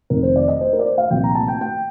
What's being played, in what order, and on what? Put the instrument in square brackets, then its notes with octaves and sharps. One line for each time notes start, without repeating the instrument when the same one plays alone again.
[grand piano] F1 F2 D#3 A#4
C5
D5
D#5
C5
A#4
D5
C5
F5
C2 A#2 F3 G5
A#5
A5
G5
G5